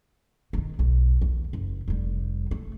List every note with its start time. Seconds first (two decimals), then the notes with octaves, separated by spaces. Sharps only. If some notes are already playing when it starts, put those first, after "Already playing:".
0.53 D#3 F3
0.79 B1
1.22 D#2
1.53 F#1
1.88 F1 G3
2.51 A3